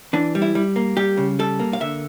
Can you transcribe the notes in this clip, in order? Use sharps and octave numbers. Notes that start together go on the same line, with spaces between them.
E3 D4
G3
E4
G3
A#3
G3 G4
C#3
G3 A4
A#3
F5
D3 E5